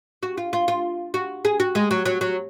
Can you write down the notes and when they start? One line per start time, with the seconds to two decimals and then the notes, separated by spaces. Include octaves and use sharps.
0.23 F#4
0.37 F4
0.53 F4
0.68 F4
1.14 F#4
1.45 G#4
1.60 F#4
1.75 G#3
1.91 F#3
2.05 F#3
2.21 F#3